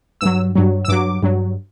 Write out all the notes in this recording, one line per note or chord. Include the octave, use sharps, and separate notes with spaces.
G2 F#3 E6
G2 F#3
E6
G2 F#3 D6
G2 F#3